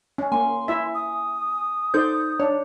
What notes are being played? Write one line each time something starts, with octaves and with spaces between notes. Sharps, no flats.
C#4
A#3 C#4 G#5 C6
E4 E5
D#6
D#4 A4 C5 D5 G6
D4 C#5